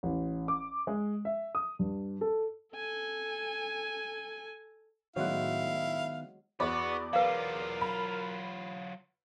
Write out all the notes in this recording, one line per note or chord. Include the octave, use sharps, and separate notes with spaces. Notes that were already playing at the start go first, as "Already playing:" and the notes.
A1
D6
G#3
E5
D#6
G2
A4
A4 G#5
A2 D#3 F#3 G#3 B3 E4 F5 F#5
E2 B3 F#4 D5 B5
F#3 F4 A#4 B4 F5
B5